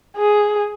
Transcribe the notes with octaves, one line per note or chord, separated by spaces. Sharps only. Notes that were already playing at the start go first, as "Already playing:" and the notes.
G#4